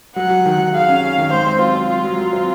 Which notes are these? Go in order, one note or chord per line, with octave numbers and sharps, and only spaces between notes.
F#3 F#5
F#3
D#3
D#3
G#4 F5
C#4
C#4
D#3
G#2 C5
C4
F#3 F4
C4
F#3 F4
F#3
F#3
C4